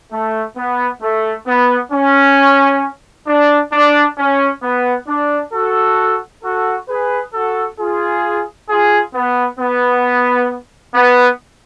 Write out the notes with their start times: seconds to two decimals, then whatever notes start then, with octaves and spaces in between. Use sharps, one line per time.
0.11 A3
0.56 B3
1.02 A3
1.47 B3
1.92 C#4
3.27 D4
3.73 D4
4.18 C#4
4.63 B3
5.08 D4
5.53 F#4 A4
6.43 F#4 A4
6.88 G#4 B4
7.34 F#4 A4
7.79 F4 G#4
8.69 F4 G#4
9.15 B3
9.60 B3
10.94 B3